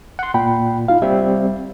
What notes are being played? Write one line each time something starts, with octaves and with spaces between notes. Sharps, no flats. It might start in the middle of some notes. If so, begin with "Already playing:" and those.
F#5 C6
A#2 G5 B5
D#4 F4 F5
G3 C4 E5